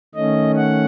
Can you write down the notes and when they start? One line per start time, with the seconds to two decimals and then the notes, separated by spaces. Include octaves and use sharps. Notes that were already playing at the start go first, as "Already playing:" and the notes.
0.15 D#3 A3 C#4 D#5
0.56 F#5